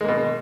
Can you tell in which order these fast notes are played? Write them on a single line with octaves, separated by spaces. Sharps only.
G#3 A#3 B2